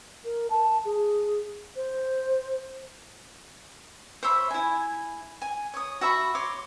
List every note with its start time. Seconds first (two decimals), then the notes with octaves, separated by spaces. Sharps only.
0.25 A#4
0.50 A5
0.85 G#4
1.76 C5
4.23 C5 C#5 E5 B5
4.50 E4 G#5
5.42 G#5
5.74 C#5 D#6
6.01 F#4 E5 B5 C#6
6.35 C#5 C6 D6